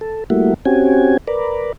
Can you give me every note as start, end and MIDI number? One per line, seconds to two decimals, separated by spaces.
0.01 0.24 69
0.30 0.54 55
0.30 0.54 57
0.30 0.54 58
0.30 0.54 64
0.30 0.54 66
0.65 1.17 60
0.65 1.17 61
0.65 1.17 66
0.65 1.17 67
0.65 1.17 80
1.28 1.73 70
1.28 1.73 71
1.28 1.73 74